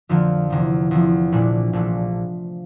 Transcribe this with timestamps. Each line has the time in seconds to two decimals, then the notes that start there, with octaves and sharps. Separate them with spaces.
0.09 F2 D3 F3 A#3
0.50 E2 C3 F3
0.91 E2 C3 F3
1.32 A#1 A#2 A3 D4
1.73 A#1 A#2 A3 D4